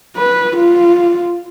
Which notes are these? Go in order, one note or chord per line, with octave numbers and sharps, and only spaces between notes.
B4
F4